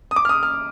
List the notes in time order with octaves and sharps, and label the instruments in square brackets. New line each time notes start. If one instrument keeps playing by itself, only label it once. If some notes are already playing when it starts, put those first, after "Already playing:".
[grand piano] D#6
D6
F6
D#6
F6